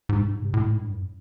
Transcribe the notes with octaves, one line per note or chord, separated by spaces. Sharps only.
G#2
G2
G#2
C3
A2
G#2
G2
F#2